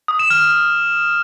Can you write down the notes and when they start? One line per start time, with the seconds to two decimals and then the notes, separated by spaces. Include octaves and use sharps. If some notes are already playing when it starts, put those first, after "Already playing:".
0.08 D#6
0.19 E7
0.30 F6